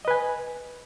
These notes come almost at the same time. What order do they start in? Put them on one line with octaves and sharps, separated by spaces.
D#5 B4 G#5